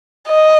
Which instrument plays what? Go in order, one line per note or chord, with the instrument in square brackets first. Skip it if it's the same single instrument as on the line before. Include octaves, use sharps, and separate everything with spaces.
[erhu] D#5